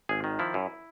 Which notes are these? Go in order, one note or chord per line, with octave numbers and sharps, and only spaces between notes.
G#1 G#4
D#3
F3 E4
F#2